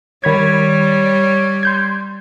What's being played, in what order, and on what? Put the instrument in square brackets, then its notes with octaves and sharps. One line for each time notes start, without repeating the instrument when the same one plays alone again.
[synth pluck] D#3 B5 G#6 [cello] G3 [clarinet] C#5
[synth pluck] C6 G6 G#6